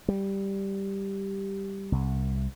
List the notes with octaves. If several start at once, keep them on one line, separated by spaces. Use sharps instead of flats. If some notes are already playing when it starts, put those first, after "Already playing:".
G3
C2